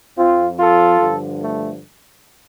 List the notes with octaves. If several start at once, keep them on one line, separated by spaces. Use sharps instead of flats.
F2 F3 C4 F4
F4 A4
G2 D3 F3
A3